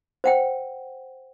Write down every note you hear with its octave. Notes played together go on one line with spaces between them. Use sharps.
C5 F#5 G5